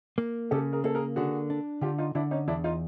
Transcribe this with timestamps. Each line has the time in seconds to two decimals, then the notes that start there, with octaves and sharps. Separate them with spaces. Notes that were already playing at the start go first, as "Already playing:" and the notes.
0.18 A#3
0.51 C#3 G4 A4
0.73 G#4 A#4
0.84 A#3 A4
0.95 G#4 A#4
1.16 D3 F#4 G#4
1.50 D4
1.81 D3 F4 G4
1.98 D#4 F4
2.15 D3 D4 E4
2.31 C#4 D#4
2.48 E2 D4 E4
2.64 D#4 F4